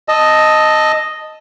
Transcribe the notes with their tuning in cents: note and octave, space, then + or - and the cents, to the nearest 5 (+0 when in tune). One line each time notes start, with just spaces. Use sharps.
D#5 +0 A5 +5 E6 -20